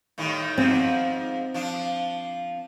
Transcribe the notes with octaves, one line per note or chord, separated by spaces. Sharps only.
A2 D#3 G3
G#2 B2 F3 C4
F3 D4